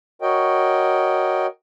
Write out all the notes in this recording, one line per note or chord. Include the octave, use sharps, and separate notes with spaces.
F#4 A#4 C#5 D#5 G5